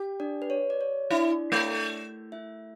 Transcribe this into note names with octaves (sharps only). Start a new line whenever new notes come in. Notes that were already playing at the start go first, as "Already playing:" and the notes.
Already playing: G4
D4 D5
B4
C#5
D5
C#5
D4 E4 D5
A3
E4 E5